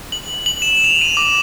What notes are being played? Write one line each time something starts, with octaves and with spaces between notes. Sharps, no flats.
F#7
F#7
E7
F7
D#7
D6